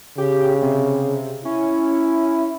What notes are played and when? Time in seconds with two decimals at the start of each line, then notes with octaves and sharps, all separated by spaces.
0.18 C#3 G4
0.62 C3
1.45 C#4 E4